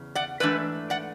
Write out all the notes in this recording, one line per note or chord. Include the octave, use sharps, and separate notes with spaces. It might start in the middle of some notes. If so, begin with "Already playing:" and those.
Already playing: E2 C#3
D5 F#5
G#2 E3 A3 D4 B4 D5
D5 F#5